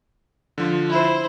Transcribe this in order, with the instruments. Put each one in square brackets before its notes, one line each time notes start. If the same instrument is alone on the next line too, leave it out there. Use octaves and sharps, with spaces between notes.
[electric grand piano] D3 F3 F4
[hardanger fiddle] E4 C5